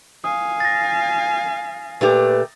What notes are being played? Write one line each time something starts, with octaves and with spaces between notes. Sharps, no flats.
F5 G#5 D#6
A6 A#6
A#2 A3 G4 B4